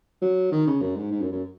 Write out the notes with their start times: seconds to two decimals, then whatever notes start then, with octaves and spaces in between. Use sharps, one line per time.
0.22 F#3
0.52 D#3
0.67 C#3
0.82 F#2
0.96 G#2
1.12 G#2
1.21 F#2
1.32 F#2